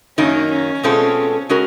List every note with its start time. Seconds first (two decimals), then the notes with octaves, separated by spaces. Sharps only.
0.18 F#2 D#3 F#3 A#3 C#4 D#4
0.51 C#4
0.83 B2 G#3 C4 F4 A4
1.49 G#3 C#4 F#4 A#4